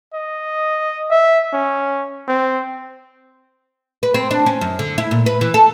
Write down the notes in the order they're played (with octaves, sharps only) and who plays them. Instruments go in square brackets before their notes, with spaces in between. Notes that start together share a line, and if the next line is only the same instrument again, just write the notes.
[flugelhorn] D#5
E5
C#4
C4
[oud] B4
C4
D4
C#4
F#2
D3
E4
A#2
B4
E3
A4